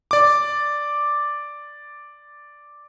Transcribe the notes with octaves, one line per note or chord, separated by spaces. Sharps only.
D5 D6